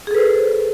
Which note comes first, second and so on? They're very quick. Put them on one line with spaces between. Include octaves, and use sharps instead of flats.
G#4 A4 B4 C5